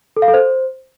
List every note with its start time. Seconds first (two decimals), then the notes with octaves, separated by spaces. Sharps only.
0.17 A4
0.22 F5
0.28 A4
0.34 C5